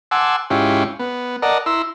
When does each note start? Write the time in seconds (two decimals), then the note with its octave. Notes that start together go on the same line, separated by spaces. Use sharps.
0.11 F#5 G#5 A5 C6 D6 E6
0.50 G#2 C#4 E4 F4 G4
0.99 B3
1.42 A#4 D5 D#5 F#5 A5 A#5
1.66 E4 A#5 C6 E6